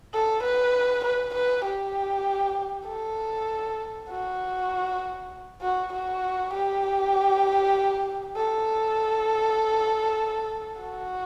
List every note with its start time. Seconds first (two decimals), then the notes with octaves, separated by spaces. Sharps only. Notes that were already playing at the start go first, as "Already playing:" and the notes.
0.14 A4
0.43 B4
1.05 B4
1.35 B4
1.65 G4
2.87 A4
4.10 F#4
5.62 F#4
5.93 F#4
6.54 G4
8.37 A4
10.81 F#4